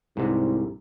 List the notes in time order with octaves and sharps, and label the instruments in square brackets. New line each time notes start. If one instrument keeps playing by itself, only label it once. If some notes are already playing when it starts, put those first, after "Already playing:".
[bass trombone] C2 [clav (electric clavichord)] G#2 C3